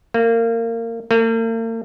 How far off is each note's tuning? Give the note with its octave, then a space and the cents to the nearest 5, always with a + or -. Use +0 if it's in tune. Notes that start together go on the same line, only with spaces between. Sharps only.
A#3 -25
A#3 -45